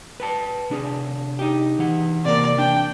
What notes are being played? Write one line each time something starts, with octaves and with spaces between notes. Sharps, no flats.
B4 G5 A5
C3 D4 G#4
D#4 G4
E3 F#5
C3 A#3 D5
D4 G5